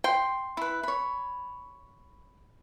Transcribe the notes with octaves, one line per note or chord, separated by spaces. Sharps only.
G5 C6
E4 B4
C#5 B5